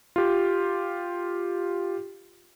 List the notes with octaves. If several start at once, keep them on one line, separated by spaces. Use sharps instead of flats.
F4 G4